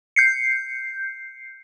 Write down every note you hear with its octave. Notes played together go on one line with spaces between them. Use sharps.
G6 C7 C#7